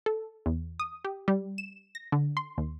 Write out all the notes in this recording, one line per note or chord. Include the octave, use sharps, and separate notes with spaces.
A4
E2
D#6
G4
G3
E7
A#6
D3
C6
D#2